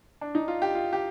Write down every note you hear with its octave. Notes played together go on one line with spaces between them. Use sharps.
D4
D#4
F4
G4
F4
G4